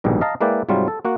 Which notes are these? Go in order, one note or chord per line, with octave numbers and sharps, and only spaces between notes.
A#1 G#2 B2 D#3 G3
D#5 F5 A5 A#5
G#3 A#3 E4 B4 D5 G5
G#2 C3 F#3 G3 F4
A4
A#3 F#4 F#5